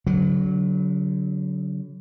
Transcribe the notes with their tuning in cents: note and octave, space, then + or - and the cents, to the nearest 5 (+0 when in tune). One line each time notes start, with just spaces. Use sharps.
D3 -40 F#3 +0